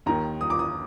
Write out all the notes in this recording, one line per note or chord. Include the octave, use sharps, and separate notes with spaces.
D#2 D#3 A#5
D#6
D6
D#6